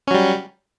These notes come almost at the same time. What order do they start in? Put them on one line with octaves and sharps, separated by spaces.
C#4 F#3 G3